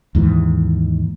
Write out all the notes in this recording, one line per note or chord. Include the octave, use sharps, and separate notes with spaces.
D#2 G#2 E3